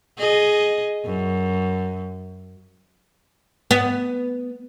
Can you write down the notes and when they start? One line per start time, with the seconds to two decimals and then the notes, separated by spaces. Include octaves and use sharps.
0.18 G#4 D#5
1.05 F#2
3.71 B3